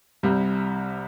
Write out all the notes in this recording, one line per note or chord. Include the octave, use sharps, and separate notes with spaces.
C2 C3 G3